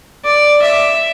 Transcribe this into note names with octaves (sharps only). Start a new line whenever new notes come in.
D5
E5